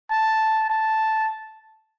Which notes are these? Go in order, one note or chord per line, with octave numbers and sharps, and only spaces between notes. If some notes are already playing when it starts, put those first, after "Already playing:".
A5
A5